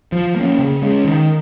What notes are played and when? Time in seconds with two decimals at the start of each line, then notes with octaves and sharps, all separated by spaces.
0.12 F3
0.35 A#3 C#4
0.59 C#3
0.82 G#3 C#4
1.04 D#3